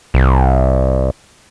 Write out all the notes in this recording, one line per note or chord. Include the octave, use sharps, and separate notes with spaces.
C2